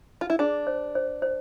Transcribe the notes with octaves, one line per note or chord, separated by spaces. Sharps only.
F4
E4
D4 G#4
C5
C5
C5